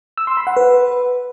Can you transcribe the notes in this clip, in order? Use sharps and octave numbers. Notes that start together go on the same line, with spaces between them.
E6
C6
B5
F#5
B4